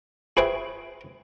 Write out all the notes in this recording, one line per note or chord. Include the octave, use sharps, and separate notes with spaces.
F#4 G#4 B4 C5 E5 G5